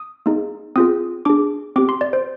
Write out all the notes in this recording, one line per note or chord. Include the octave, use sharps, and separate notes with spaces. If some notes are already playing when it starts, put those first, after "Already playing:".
Already playing: D#6
A#3 D#4 G#4
C4 F4 G#4 D#6
D4 G#4 D6
C4 G4 D6
C6
D5
C5